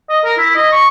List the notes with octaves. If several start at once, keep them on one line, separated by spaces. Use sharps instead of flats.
D#5
A#4
E4
D#5
C#6